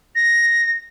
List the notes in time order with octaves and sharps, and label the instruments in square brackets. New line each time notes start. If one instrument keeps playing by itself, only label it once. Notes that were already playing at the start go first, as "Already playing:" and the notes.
[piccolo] A#6